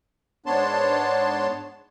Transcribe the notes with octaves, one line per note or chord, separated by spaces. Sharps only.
G#2 B3 D4 C#5 A5 C6